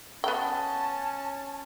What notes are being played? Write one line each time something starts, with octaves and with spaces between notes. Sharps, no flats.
B3 C#4 G5 A5